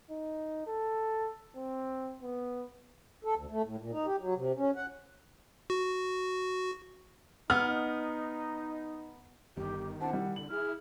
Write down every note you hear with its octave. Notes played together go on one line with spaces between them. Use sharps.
D#4
A4
C4
B3
A4
D2
A3
A2
A#2
D#4
G4
F#3
C3
C#4
F#5
F#4
B3 D#4 F6
G1 D#3 G4
C4 D4 E4 F#5 A5
G3 E4
D3 F#7
E4 G#4 F6